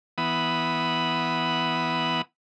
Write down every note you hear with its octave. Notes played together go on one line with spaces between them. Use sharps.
E3 B3 F#5 B5 D#6